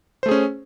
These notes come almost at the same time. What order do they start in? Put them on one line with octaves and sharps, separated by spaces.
C5 A3 G#4 C#4